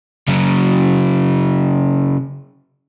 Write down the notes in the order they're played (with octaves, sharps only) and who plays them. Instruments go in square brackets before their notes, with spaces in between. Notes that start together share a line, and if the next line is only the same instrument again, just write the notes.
[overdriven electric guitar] C#3 F#3